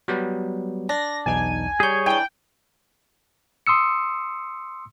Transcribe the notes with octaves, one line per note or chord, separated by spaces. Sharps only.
F#3 G3 B3
D4 A#6
B1 E2 D#4 G#5
G3 G#4 C#5 G6
E3 D4 G5
C6 D#6 E6 C#7